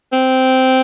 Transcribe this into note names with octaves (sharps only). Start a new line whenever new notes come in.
C4